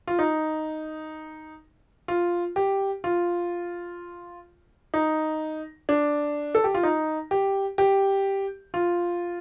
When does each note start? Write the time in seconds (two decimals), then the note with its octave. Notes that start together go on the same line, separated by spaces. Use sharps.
0.07 F4
0.19 D#4
2.08 F4
2.56 G4
3.04 F4
4.94 D#4
5.89 D4
6.55 A4
6.64 G4
6.74 F4
6.83 D#4
7.31 G4
7.78 G4
8.74 F4